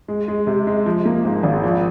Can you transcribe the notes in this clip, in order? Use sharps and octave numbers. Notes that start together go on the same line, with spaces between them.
G#3
G#3
C3
G#3
F3
A#3
G#2
G#1
F3